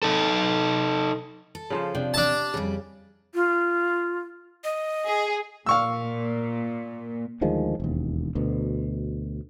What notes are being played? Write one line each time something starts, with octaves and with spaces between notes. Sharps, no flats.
D#4 A4
A4
C#3 F3 C5
C3 D4 G5
D4 G4 E5 A5
F2 C#3 G3
F4
D#5
G#4
A#2 F5 C#6 E6
D2 D#3 F3 G#3
E1 D#2
D2 B2